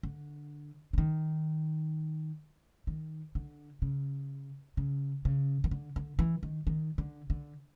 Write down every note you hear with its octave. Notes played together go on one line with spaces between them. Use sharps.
D3
D3
D#3
D#3
D3
C#3
C#3
C#3
D#3
D3
D3
E3
D#3
D#3
D3
D3